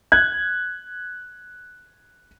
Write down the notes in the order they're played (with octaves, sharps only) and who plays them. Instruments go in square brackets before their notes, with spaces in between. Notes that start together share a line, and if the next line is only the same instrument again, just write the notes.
[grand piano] F#6 G#6